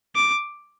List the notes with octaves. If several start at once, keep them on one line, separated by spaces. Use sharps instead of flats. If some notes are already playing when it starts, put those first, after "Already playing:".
D6